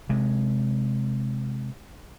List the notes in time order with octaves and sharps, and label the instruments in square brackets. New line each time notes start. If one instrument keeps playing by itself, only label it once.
[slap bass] C3 G#3